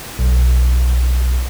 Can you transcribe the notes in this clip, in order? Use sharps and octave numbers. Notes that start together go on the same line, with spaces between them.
B1